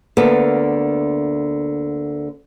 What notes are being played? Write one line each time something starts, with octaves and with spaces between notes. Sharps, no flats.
D2 D3 A#3 B3 A4 B4